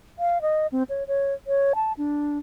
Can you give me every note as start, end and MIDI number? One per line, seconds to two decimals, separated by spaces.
0.19 0.41 77
0.42 0.67 75
0.72 0.83 60
0.89 1.04 73
1.08 1.34 73
1.47 1.73 73
1.75 1.93 81
1.98 2.38 62